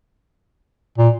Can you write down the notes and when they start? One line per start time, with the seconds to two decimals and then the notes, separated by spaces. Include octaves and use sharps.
0.98 A#2